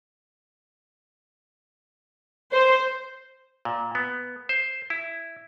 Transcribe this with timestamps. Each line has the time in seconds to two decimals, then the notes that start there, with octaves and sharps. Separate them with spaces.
2.52 C5
3.65 A#2
3.95 B3
4.49 C5
4.90 E4